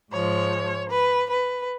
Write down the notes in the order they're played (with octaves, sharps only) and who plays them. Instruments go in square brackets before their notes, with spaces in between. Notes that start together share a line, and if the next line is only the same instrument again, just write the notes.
[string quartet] G#2 F3 G#3 C#5
B4
B4